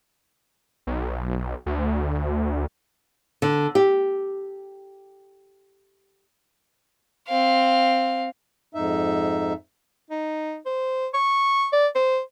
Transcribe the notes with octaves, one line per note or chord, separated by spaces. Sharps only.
B1
D2
D3
G4
C4 F5
F2 G#2 D#4 E5
D#4
C5
C#6
D5
C5